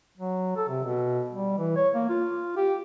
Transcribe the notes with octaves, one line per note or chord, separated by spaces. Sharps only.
F#3
A4
C3
B2
G3
E3
C#5
A#3
F4
G4